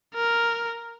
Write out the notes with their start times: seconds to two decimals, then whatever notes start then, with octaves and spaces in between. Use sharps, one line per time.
0.14 A#4